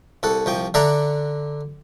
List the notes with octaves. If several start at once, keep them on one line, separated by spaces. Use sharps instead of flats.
C2 A4 F#5
C2 F3 G5
D3 D4 D5 E5 F#5 A#5